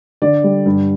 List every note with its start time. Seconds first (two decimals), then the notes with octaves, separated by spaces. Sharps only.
0.22 D3 D5
0.44 G3
0.66 G2